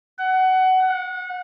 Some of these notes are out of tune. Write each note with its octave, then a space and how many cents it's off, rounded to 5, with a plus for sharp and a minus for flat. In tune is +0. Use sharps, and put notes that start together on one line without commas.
F#5 +20
F#5 -30